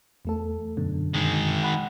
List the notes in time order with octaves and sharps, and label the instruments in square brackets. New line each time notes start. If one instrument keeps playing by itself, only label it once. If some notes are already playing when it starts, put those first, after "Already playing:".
[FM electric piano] E2 A3 A4
F#2 B2 D3
[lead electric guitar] D#3 G#3
[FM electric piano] F#5 B5